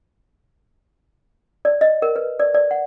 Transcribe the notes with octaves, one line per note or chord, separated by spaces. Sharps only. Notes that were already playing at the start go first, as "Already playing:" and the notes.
D5
D#5
A#4
B4
D5
D5
F#5